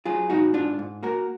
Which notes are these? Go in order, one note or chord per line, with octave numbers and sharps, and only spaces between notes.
F#3 F4 G#4
G#2 D#4 F#4
G#2 D4 F4
G#2
A#3 F#4 A#4